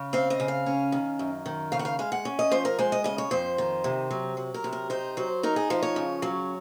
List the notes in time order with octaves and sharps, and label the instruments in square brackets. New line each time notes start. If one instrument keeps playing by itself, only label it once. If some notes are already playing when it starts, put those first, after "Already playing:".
Already playing: [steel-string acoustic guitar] C#3
C4 F5
D#5
C#3
F5
C#4
D#3
F#2
D#3
C#3 F5
F#5
F5
G#3 F5
F#5
C#4
D#5
F3 C5
A#4
G#3 C5
D#5
C#3 D#5
C#5
F2 C5
D#3
C3
F#3
F#3
A#4
C3
A#4
D#4 C5
F#3 C5
D#4 A#4
G#4
F3 C5
C#5
C#3
F#3